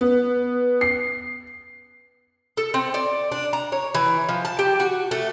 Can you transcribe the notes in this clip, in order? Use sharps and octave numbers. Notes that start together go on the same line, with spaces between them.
B3
C7
A4
C4
D5
D4
A#5
C#5
E3
F3
A5
G4
F#4
A3